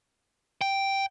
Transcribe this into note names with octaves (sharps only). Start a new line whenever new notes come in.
G5